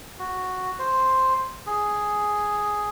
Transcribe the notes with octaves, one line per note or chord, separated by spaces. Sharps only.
F#4
C5
G#4